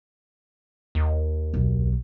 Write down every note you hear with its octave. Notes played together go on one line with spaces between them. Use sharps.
D#2
B1